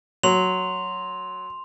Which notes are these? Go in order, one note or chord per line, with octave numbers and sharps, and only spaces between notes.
F#3 C6 F7